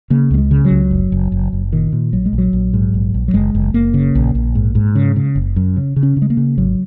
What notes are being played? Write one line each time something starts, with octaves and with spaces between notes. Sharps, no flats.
C#3 A#3
C#2 A#3
G#3
C#3
F#3
C#2
F#1
F#1
F#1
F#1
A#2 D#3
A#2
A#1 F#3
G#3
A#1
F#3
A#1
G#2
A#1
A#1
F#3
F#1 G#3
F#1
F#1 A#3
C#3
A#1
A#1
G#2
G#2
C#3
C#3
F#1
F#2
C#3
C#3
C#4
C#3
G#3
A#3
C#3
G#1 F#3